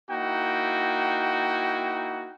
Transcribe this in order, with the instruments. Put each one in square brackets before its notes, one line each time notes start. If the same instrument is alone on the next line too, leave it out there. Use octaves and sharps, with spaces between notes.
[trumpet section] A#3 D#4 E4 F#4 G5